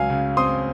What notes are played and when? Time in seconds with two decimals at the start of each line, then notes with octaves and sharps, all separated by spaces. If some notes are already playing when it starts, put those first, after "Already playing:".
Already playing: C#2 F#3 F5 G#5
0.10 C#3
0.37 C4 C6 D#6